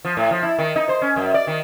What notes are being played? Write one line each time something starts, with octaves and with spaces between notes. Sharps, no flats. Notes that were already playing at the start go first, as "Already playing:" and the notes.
F3
A2
F3
E4
D#3
D#4
C5
C#4
F#2
D5
D#3